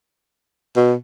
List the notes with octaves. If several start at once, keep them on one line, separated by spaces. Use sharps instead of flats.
B2